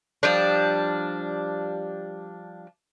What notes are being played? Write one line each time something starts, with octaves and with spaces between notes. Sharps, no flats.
F3 G3 D4